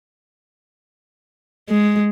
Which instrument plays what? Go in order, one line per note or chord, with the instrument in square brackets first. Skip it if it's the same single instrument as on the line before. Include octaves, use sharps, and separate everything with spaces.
[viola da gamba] G#3